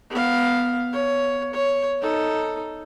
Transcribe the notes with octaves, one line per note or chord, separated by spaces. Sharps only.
B3 F5
C#5
C#5
D#4 A4